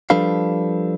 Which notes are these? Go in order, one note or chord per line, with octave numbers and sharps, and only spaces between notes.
F3 G3 D4 A4 B4 F5